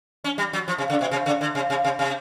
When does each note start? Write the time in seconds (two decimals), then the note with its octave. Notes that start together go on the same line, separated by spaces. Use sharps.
0.24 C#4
0.38 G3
0.53 F#3
0.68 F3
0.78 C3
0.90 C#3
1.01 B2
1.11 C3
1.26 C#3
1.41 D3
1.55 C3
1.70 C3
1.84 C3
1.99 C3